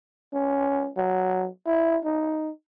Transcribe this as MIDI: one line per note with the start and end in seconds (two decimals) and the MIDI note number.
0.34 0.90 61
0.97 1.48 54
1.66 1.98 64
2.05 2.50 63